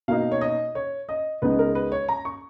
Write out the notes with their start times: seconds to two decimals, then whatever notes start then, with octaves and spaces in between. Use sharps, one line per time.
0.08 B2 A#3 D#4 F5
0.32 C#5
0.41 D#5
0.75 C#5
1.09 D#5
1.42 C#2 C#3 G#3 B3 D#4 B4
1.59 A#4
1.75 B4
1.92 C#5
2.08 A#5
2.25 C#6